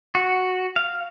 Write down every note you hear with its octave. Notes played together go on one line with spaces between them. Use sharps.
F#4
F5